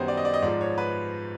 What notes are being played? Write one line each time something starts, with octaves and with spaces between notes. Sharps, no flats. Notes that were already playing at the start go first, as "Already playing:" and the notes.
Already playing: F#2 D#3 G3 B3 C5 C#5
D5
D#5
D5
D#5
G#2 F3 G#3 D5
C#5
B4